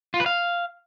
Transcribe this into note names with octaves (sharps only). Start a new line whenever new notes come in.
F4
B4
F5